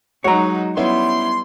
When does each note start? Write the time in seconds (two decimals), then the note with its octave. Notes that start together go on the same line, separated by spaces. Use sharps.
0.24 F#3 G#3 D#4 F#4 C#5 A#5
0.77 G3 B3 C#4 E4 C6